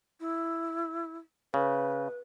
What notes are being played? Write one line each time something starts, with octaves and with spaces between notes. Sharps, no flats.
E4
C#3 B4